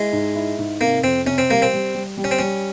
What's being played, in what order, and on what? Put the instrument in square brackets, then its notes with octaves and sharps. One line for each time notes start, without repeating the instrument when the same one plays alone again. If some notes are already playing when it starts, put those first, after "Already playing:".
Already playing: [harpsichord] G#3 [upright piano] E4
[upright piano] G#2
E4
G#2
[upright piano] C3 [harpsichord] A#3
[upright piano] F2 [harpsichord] C4
[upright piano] C3 [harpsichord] C#4
[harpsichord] C4
[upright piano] G3 [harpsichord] A#3
[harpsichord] C4
[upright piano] G3
G3
G3
[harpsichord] C#4
C4
[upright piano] G3 [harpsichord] C#4